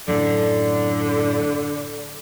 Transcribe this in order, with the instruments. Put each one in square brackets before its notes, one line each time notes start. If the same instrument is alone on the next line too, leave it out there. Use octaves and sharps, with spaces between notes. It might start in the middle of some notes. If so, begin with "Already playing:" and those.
[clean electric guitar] F#2 A2 [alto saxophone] D3